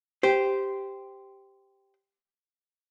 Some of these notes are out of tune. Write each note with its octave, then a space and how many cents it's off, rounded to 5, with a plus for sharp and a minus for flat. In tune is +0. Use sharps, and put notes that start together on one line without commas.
G4 +0 C5 -10